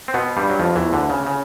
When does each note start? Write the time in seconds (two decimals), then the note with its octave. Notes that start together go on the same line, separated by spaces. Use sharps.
0.08 C4
0.14 B2 B3
0.37 G2 G3
0.50 F#3
0.60 F2 F3
0.76 E2 E3
0.92 D2 D3
1.10 C#3
1.27 C#3